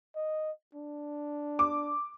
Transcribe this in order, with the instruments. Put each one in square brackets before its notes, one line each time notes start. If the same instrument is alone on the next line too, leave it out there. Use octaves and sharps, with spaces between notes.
[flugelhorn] D#5
D4
[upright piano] D6